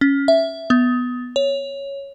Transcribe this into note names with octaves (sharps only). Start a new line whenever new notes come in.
C#4
E5
B3
C#5